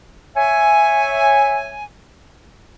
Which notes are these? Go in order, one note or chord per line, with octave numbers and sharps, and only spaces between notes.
C#5 E5 G#5